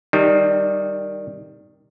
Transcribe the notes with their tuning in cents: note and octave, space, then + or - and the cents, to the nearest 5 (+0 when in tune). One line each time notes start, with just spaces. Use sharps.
D#3 +0 G3 +0 D4 +45